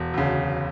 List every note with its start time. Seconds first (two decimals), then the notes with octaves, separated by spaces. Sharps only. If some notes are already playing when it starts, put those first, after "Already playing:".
Already playing: E1
0.14 D2 C#3